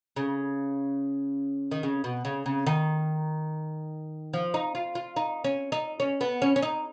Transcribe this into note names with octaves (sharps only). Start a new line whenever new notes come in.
C#3
D#3
C#3
B2
C#3
C#3
D#3
F3
D#4
F4
F4
D#4
C#4
D#4
C#4
B3
C#4
C#4
D#4